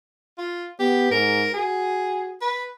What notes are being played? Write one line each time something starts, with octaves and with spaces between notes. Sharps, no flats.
F4
B3 G4
G#2 A#4
F#4 G#4
B4